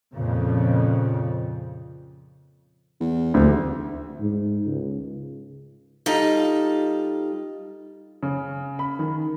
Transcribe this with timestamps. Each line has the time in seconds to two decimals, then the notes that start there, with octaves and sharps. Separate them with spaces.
0.14 F2 A#2 C#3
3.01 E2
3.34 F1 D2
4.20 G#2
4.66 C#2
6.06 G3 D#4 F4 A4
8.23 C#3
8.79 B5
8.99 D#3